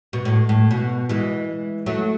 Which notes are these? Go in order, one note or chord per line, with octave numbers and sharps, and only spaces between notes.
B2
A2
A2
B2
E3 G#3
F#3 A3